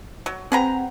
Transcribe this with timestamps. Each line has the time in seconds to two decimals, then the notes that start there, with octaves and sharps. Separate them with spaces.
0.26 F#3
0.52 C4 G#4 B4 F#5 G5 A#5